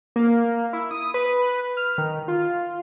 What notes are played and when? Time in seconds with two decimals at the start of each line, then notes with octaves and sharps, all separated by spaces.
0.16 A#3
0.73 E4
0.91 D#6
1.14 B4
1.77 F6
1.98 D#3
2.28 F4